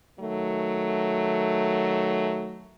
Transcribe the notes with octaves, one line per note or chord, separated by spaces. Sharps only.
D#3 F#3 A3